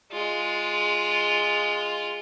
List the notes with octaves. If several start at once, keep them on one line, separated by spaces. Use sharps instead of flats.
G#3 F4